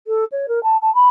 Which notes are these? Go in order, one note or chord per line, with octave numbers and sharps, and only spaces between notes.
A4
C#5
A#4
A5
A5
B5